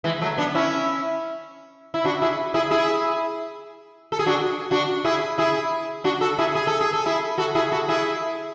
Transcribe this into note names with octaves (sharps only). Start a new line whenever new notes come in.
E3 G#3
F#3 A3
B3 D4
C#4 E4
E4
D4 F#4
E4 G#4
E4 G#4
E4 G#4
A4
G#4
D4 F#4
D4 F#4
E4 G#4
E4 G#4
D4 F#4
F#4 A4
E4 G#4
G#4
A4
G#4
A4
E4 G#4
F#4 A4
E4 G#4
F#4 A4
E4 G#4